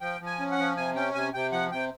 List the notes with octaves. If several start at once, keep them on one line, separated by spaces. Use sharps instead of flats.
F3 G5
F3
G#5
C#4
F#5
F3
C3 G#5
C#4 G5
C3 G#5
C3 G5
F3 F#5
C3 G5